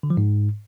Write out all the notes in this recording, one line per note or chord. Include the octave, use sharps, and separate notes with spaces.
D3
F3
G#2